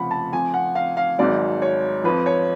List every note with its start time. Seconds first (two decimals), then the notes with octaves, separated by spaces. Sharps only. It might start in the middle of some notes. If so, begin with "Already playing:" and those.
Already playing: F1 F2 C#3 F3 F#5 B5
0.11 A5
0.33 F2 F3 G#5
0.54 F#5
0.75 F5
0.97 F5
1.18 G#1 G#2 F#3 D5
1.62 C#5
2.04 F2 F3 B4
2.26 C#5